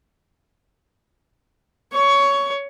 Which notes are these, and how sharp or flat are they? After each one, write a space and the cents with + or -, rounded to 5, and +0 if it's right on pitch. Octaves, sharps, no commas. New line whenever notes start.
C#5 +15 C#6 +15